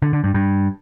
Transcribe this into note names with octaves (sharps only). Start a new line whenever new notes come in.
D3
D3
G2
G2